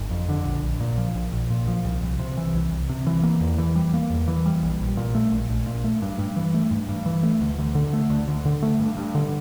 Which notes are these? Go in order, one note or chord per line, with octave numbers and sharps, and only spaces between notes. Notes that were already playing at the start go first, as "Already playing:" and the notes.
Already playing: G1
F2
D3
A#1
A#1
A#2
F3
A#1
A#1
A#2
F3
C2
C2
C3
E3
C2
C2
C3
E3
A#3
E2
E3
G3
A#3
E2
E3
G3
A#1
A#1
A#2
A3
A#1
A#1
A#2
A3
G2
G2
E3
A3
G2
G2
E3
A3
D2
D2
D3
A3
D2
D2
D3
A3
G2
G2
D3